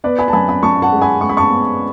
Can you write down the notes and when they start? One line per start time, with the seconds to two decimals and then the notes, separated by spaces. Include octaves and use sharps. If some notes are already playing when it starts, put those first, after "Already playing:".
0.04 B3 B4 D5
0.19 G#5 B5
0.28 A5
0.33 F#2 G#5 B5
0.48 G#5 B5
0.63 F#2 A5 C#6
0.82 F#5 A5
0.92 G#3
1.02 G#5 B5
1.21 G#3 C#6
1.29 B5
1.37 A5 C#6
1.51 B3